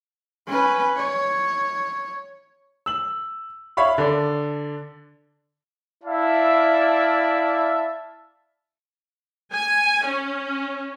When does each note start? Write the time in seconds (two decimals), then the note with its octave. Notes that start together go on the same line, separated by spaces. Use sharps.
0.47 C#4 B4
0.96 C#5
2.86 E6 F#7
3.77 C#5 E5 F5 B5 C#6
3.98 D3 D4
6.03 E4 D5 E5 F5 A5
9.54 G#5
10.05 C#4